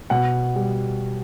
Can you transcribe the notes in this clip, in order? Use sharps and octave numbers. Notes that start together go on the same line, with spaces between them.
B2 F#5
G3